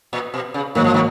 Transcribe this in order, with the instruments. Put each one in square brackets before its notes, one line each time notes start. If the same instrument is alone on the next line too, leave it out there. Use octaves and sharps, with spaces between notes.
[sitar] A#2
B2
C#3
[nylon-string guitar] G#2 F#3 A#3 [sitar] D#3
[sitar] F3
B2 D#3